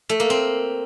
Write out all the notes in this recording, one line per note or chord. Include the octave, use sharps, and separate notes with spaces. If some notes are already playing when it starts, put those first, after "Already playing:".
A3
A#3
C4